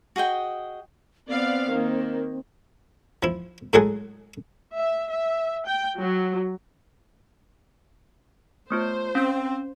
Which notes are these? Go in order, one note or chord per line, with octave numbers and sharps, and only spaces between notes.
F#4 G#4 D#5 G5
B3 C4 D5 F5
D#3 A#3
F3 E4
A2 F#3 G#3 G#4 A4 F#5
E5
E5
G5
F#3
A3 B3 F4 C5
C4 C#4